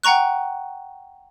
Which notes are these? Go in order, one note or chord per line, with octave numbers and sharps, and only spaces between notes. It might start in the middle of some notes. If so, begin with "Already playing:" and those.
F#5 G5 A#5 C#6 F#6